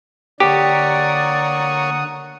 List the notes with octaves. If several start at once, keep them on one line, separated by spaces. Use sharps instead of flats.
D3 A#3 G4 C#5 D5 F#5 D#6